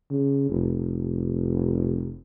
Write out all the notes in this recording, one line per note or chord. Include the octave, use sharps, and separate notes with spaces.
C#3
F1